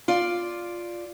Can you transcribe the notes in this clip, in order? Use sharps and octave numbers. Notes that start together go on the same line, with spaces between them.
F4 D5